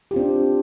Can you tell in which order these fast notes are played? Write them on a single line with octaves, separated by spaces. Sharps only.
G4 F4 C4 D4